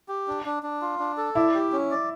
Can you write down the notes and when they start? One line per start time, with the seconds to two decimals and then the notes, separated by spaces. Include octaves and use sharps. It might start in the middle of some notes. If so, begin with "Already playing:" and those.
0.08 G4
0.28 D4
0.46 D4
0.63 D4
0.82 F4
0.99 D4
1.17 A4
1.35 E4 D5
1.55 G4
1.72 C#4
1.91 D5